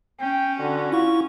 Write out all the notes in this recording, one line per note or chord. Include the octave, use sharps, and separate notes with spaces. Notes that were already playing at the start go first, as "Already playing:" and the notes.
C#4 G5
D3 F#4
E4 F4 C#6